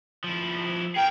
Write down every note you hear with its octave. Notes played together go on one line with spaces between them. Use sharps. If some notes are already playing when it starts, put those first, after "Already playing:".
F3 E4
G#4 A#4 G5